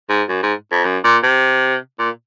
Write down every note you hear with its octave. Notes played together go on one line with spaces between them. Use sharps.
G#2
F#2
G#2
F2
F#2
A#2
C3
A#2